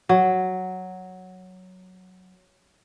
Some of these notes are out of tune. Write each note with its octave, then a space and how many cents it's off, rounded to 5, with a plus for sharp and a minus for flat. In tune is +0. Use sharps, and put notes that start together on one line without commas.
F#3 +0